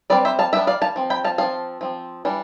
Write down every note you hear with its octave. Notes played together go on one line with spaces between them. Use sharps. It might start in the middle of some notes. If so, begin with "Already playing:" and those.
G3 C4 B4 D5
C5 E5
F5 A5
G3 B3 D4 E5 G5
D5 F5
F5 A5
F3 C4
G5 B5
F5 A5
F3 C4 F5 A5
F3 C4
E3 G3 D4